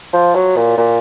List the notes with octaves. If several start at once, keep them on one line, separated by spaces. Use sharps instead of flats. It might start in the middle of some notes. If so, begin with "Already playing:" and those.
F3
F#3
A#2
A#2